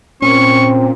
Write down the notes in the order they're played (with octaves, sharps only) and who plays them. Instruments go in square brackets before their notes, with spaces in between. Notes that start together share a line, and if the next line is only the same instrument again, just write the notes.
[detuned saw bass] A#2 [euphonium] C4 [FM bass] C#4 [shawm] C#6